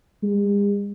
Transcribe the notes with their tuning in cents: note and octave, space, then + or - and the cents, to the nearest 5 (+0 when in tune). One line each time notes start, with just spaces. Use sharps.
G#3 -45